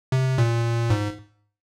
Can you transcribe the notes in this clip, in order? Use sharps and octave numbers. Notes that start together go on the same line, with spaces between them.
C3
A#2
G#2